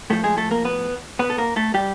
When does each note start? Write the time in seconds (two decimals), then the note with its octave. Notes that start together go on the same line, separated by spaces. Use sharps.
0.10 A2 F3 A3 A4
0.24 G#3 G#4
0.37 A3 A4
0.51 A#3 A#4
0.65 B3 B4
1.19 B3 B4
1.30 A4
1.38 A#3 A#4
1.56 A3 A4
1.74 G3 G4